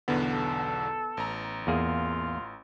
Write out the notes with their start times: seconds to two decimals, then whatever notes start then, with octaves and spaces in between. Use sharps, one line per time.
0.08 B1 E2 D3 B3
0.33 A4
1.17 A1 A#5
1.67 E2 A#3 F4 G#4